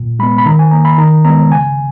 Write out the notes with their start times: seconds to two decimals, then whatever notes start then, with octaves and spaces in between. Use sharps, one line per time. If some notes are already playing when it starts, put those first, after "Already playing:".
Already playing: A#2
0.19 G#3 B5
0.23 B3
0.38 B5
0.46 D#3 A#5
0.59 G#5
0.71 A#3 A#5
0.85 B5
0.98 D#3 A#5
1.25 G#3 B3 A#5
1.51 C#3 G#5